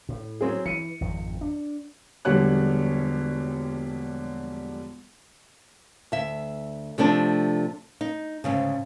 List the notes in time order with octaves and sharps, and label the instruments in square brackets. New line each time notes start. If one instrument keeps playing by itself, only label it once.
[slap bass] A2
[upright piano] F#3 C4 G#4
[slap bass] E3 [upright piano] C#7 D#7
[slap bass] G#1 F2 D#3
D4
[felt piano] E1 A#1 D3 G3 C#5 F#6
[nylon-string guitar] D2 E5
C3 F3 A3 C4 D4
D#4
D2 G#2 C#3